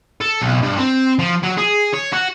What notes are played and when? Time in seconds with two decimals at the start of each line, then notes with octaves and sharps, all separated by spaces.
0.21 A4
0.41 B1
0.62 G2
0.77 C4
1.19 F3
1.43 F#3
1.58 G#4
1.93 C#5
2.12 F#4